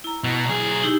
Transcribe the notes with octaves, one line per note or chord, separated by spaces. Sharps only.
E4 A#5
B2
B1 G#4
D#4 E4 G4